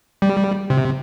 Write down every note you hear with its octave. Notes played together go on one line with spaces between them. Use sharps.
G3
C3